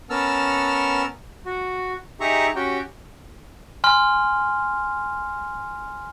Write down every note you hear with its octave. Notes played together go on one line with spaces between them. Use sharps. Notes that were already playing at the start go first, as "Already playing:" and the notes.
B3 C#4 A#4 A5 E6 F6
F#4
D#4 G4 G#4 E5 A#5 C#6
C#4 F#4 G4 G5
G#5 C6 F6